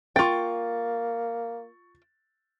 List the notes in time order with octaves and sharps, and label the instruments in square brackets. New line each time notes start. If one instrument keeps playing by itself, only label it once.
[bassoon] A#3 [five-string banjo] F4 G5 [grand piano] C#6 A6